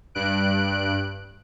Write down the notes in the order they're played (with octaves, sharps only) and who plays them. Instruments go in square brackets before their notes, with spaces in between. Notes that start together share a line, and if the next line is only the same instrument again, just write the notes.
[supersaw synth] G2 F#6 D7